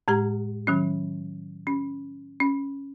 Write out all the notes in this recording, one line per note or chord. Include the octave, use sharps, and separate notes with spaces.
A2 G#3 G4 A#5
D#3 F#3 C#4
C#4
C#4